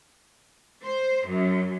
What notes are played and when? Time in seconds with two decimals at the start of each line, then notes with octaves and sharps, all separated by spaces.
0.83 C5
1.27 F#2